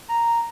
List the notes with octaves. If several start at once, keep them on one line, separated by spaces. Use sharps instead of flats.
A#5